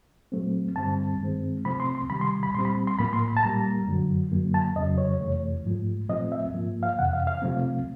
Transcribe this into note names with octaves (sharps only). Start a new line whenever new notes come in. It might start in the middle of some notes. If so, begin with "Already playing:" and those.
A#2 F#3 A3 C4
G2 D3 G3 C4 A5
G2 D#3 G#3 C4
C3 F3 A3 C4 B5
C6
C6
C3 D#3 G3 B5
C6
B5
A#2 G3 C4 C6
B5
C6
A2 F3 A#3 B5
C6
B5
A5
A#2 G3 A#3 A#5
F#2 D3 F#3
F#2 D3 F#3 A#3
A5
F2 C#3 F#3 D#5
C#5
F2 C3 E3 A3
G#2 F3 A3
A#2 F3 A3 C4 D#5
E5
G#2 F3 A#3
F5
F2 C3 E3 F#5
F5
F5
C3 F3 A3 C4